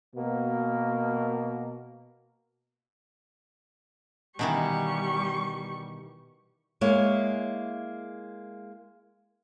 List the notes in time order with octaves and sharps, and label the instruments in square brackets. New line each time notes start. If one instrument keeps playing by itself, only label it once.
[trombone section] B2 A#3
[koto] B2 D#3 E3 [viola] G3 C#6
[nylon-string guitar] G#3 A#3 E4 C#5